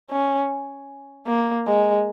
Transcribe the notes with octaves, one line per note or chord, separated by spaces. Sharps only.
C#4
A#3
G#3